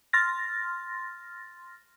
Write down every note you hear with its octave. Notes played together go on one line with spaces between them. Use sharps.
C6 F6 A6 A#6